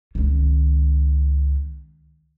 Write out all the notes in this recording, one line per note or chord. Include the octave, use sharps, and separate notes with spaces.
C#2 D#3